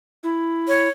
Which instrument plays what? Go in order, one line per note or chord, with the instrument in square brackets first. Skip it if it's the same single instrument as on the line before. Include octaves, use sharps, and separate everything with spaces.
[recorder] E4
[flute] C#5